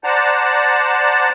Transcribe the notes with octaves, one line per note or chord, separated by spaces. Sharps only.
C5 D5 F#5 A5 A#5